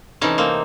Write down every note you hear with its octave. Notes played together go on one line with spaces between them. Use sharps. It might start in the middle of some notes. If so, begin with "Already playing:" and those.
C3 E3 A3 C#4 D#4
A#3 C4